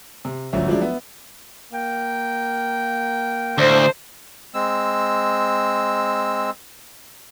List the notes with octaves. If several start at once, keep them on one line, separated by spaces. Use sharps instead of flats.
C3
D1 G1 F3 F#3 C#4 E5
F3 F#3 G#3 D4 E4
B3 E5
A#3 A#4 G5
D2 A2 A#3 C5
G#3 C4 E6